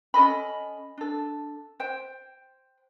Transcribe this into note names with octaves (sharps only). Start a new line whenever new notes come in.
C#4 A4 D#5 B5
D4 A4
C5 G5